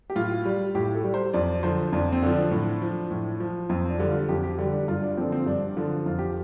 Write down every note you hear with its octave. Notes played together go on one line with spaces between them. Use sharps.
G4
A2 F4
G3
A2 G4
A4
G3
C5
F2 D5
D3 F3 C5
F2 D4
C4
D3 F3
D4
A2
F3
A2
F3
F2 C4
D4
D3 G3
F4
F2 G4
G4
D3 G3 D4
D4
G2 F4
D4
D3 F3 C4
C4
G2 D4
D3 F3
F2 F4
G4